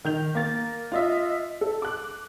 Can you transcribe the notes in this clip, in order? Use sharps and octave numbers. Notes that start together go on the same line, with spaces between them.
D#3 G6 F7
A#3 A6
F4 D#5 E5
A4
D6 F#6